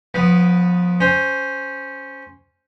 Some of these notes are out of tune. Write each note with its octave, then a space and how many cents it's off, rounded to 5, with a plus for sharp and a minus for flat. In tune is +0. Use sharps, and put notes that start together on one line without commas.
F3 +30 B3 +0
C#4 +0 C5 +0